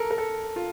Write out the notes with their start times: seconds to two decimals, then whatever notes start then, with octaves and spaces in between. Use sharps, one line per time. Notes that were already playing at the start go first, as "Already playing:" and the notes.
Already playing: A4 A#4
0.11 A#4
0.18 A4
0.56 F4